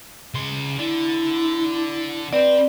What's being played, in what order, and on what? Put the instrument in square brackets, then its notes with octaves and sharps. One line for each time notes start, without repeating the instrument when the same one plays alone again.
[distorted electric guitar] C#3 C6
[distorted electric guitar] D3 [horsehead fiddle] E4
[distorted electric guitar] C4 [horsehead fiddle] B4 [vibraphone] D5